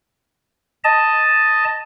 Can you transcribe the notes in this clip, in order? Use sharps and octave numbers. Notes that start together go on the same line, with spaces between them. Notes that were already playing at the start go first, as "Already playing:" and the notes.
D#5 A5